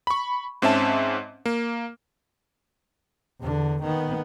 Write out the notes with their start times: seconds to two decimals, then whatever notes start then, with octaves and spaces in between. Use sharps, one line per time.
0.07 B5 C#6
0.62 G#2 C4 C#4 E5 A5
1.46 A#3
3.40 E2 D3
3.83 D#3 B3